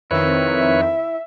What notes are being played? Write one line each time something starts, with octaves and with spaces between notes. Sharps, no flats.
F2 D#3 C4 E4 B4 C#5
E5